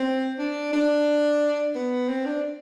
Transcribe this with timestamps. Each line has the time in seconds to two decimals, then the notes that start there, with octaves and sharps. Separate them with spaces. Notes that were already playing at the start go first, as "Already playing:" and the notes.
Already playing: C4
0.38 D4
0.73 D4
1.75 B3
2.09 C4
2.26 D4